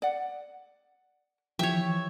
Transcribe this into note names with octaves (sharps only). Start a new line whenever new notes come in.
D5 F#5
E3 F3 G4 C#5 E5